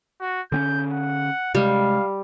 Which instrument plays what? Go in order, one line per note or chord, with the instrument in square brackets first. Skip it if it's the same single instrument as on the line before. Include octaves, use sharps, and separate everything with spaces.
[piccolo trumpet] F#4
[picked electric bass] D3 C4 C#4 [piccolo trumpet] G6
[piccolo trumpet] F#5
[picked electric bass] C3 G#3 [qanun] G3 [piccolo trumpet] F5